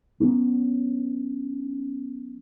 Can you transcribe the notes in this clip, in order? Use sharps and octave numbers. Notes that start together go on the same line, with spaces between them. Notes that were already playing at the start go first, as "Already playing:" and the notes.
F#3 B3 C#4 D4